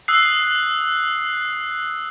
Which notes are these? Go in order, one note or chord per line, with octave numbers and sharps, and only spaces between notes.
D#6 E6 F#6 C7